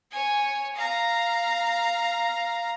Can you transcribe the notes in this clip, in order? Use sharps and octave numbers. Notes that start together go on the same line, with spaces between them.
C#5 G#5
F5 A#5